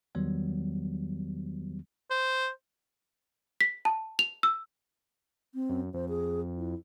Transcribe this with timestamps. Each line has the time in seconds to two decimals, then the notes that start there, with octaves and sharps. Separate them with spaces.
0.15 E2 D#3 F#3 G3 B3
2.10 C5
3.61 B6
3.85 A5
4.19 F7
4.43 E6
5.55 C4
5.70 F#2
5.94 F2 C5
6.09 G#4
6.57 E4